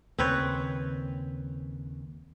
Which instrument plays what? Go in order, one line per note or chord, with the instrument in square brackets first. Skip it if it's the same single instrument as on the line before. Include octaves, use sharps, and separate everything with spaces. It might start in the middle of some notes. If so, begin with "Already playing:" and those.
[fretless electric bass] D#2 C#3 [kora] C4 B4 C#5